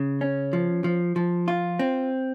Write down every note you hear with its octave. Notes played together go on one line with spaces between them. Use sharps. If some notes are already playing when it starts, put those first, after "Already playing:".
Already playing: C#3
C#4
F3
F3
F3
F4
C4